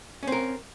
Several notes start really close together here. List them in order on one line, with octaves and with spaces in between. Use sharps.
C#4 C4 A#4